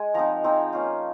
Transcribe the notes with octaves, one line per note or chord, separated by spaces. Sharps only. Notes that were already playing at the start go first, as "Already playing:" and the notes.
Already playing: G#3 G#5
F3 C4 D#4 A#5
F3 C4 D#4
A#3 C#4 F4